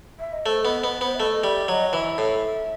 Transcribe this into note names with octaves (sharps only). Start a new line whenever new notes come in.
E5
D#5
A3 C5
B3 D#5
B3 D#5
B3 C5
E5
A3 D#5
D#5
G3 E5
F#3 D#5
E3 E5
A2